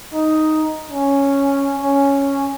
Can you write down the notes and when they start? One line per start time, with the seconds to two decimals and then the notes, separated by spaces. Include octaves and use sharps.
0.13 D#4
0.91 C#4
1.77 C#4